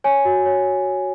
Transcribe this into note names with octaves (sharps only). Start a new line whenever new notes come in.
C#5 G#5
F#4
C#5